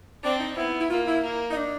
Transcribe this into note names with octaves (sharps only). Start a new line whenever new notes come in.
C4 D4
D#4
B3 E4
E4
A#3 F4
E4
A#3
D#4
D4